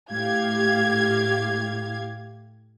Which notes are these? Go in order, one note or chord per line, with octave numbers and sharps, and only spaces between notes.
A2 G4 F5 G#6